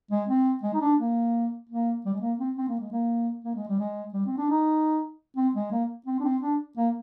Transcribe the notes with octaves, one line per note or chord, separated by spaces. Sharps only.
G#3
C4
G#3
D#4
D4
A#3
A#3
G3
G#3
A#3
C4
C4
A#3
G#3
A#3
A#3
G#3
G3
G#3
G3
C4
D4
D#4
C4
G#3
A#3
C4
D4
C4
D4
A#3